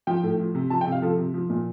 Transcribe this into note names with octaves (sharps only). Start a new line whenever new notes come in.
F3 G5
A2
F3
C3
F3 A5
G5
C3
F5
F3 A4
C3
F3
A#2